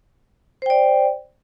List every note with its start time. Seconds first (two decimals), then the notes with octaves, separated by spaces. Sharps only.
0.62 C5
0.66 G5
0.70 D5